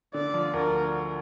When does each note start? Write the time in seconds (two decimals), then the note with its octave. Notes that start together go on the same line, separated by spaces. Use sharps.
0.14 D3 D5
0.34 F3
0.53 D2 A#4